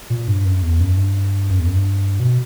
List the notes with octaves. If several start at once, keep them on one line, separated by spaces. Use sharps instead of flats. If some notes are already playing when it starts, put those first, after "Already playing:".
A#2
G2
F#2
E2
F#2
G2
F#2
E2
F#2
G2
B2